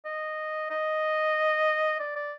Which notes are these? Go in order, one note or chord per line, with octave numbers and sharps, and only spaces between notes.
D#5
D#5
D5
D5